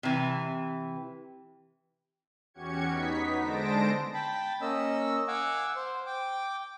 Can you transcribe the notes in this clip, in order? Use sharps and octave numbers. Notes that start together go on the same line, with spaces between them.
C3 E3
E2 C#4 F#4 G4 G#6 C#7
B3 D#4 B6
D3 G#3 C5 A5 A#6 D7
G5 A5 B5
A#3 C#4 D#5 E6
F5 F#5 G#5 D6 E6
C5
G5 D6